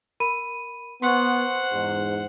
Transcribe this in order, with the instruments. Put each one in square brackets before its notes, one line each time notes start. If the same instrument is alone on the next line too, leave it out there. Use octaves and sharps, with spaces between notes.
[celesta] A#4 B5 D#7
[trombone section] B3 [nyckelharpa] C5 F#5 [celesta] C6 C#6
[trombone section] E2 G#2